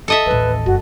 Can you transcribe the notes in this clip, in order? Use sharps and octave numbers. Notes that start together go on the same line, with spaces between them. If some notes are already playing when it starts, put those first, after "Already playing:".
A4 D#5 E5
A1 D#2 B4
F#1 F#4